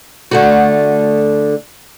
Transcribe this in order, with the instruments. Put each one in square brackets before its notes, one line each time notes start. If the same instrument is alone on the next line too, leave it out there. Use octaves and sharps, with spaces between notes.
[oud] D3 A3 F#4